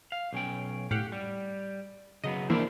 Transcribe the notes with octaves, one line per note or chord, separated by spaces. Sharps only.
F5
B1 C#4 G5
A2 G4 F5 F#5
G3
C#3 F#3 B3 D#5
E3 A#3 D4 E4 A#4 C5